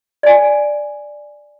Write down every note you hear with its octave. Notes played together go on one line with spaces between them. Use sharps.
D5 G#5